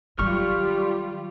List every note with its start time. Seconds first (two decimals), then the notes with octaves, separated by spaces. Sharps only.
0.19 D#3 F#3 G3 F4 G4 C#6 F6